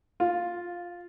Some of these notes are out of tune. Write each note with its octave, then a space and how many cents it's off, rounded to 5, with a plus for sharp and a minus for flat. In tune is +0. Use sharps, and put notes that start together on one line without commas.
F4 +5